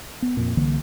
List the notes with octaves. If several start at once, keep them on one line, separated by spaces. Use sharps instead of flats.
B3
F2 A#2
C2 D3 E3 A#3